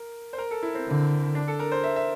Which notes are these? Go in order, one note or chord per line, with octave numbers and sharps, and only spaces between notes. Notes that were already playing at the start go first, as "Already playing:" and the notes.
Already playing: A#4
C5
A#4
A4
E4
C4
D3
D4
A4
A#4
C5
E5
E5